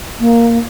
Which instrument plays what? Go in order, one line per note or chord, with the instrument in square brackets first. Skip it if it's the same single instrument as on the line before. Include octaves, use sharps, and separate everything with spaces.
[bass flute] A#3